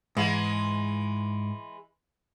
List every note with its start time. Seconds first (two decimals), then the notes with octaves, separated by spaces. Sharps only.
0.17 G#2 E3 G#3